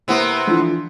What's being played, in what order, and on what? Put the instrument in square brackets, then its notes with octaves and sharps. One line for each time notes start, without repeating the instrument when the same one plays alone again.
[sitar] C3 B3 [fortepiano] A#3 E4
[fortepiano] D3 E3 F3